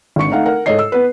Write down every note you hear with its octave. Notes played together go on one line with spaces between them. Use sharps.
G#1 D3 C#6 C#7
A3 D#4 F5 F#5
A#4 F#5
G#2 A4 C#5 D#5 C7
E6
B3 B4